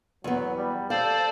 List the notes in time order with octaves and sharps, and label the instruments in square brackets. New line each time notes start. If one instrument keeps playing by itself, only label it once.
[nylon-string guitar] E2 B3 [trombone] F#3
[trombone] G3
[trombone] A4 [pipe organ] C5 D5 [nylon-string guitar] F5